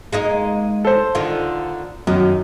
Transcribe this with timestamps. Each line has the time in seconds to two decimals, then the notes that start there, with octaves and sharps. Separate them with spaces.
0.13 G#3 A#3 D#4
0.85 A4 C5
1.15 D3 D#3 F4
2.07 F#2 D#3